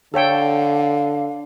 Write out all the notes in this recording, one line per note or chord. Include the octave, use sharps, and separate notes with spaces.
D3 A4 C#5 F5 G5